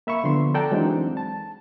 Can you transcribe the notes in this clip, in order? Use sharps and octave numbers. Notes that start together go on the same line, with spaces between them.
A#3 E5 B5 C#6
D3 F3 B3 C6
A4 D5 F#5 G5 A5 A#5
E3 F#3 G#3 C4 D4 D#4
A5